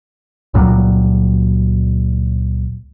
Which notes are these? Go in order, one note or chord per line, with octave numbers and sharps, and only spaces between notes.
C#2 A#2 F#3 G3